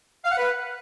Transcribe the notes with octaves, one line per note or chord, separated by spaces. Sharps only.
F5
F#5
B4